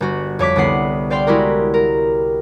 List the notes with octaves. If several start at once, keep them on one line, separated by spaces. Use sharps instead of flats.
G1 F#4
F2 C#5 D6 B6
C2 D3 B3 F#5 C7
C5 D5 F5 G5 C6
G#3 E4 F#4 G4 A#4
A#4